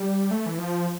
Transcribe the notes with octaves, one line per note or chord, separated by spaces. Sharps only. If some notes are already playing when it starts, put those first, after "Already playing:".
Already playing: G3
A3
E3
F3